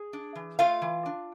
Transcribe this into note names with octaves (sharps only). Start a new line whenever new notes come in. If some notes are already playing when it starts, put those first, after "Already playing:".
Already playing: G#4
D4
E3
A3 F4 F5
E3
D4